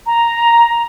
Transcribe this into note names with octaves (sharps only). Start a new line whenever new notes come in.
A#5